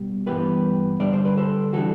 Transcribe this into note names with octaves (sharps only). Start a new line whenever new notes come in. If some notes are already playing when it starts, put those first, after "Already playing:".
Already playing: B2 G3
G2 E3 B3 G4 B4
D3 G3 D4 D5
C5
B4
A4 C5
E3 G3 D4 F#4 A4